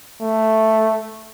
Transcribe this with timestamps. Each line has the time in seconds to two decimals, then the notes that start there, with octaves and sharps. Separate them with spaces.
0.21 A3